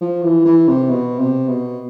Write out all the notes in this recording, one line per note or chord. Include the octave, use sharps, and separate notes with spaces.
F3
E3
E3
C3
B2
C3
B2